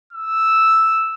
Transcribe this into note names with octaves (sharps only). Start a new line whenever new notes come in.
E6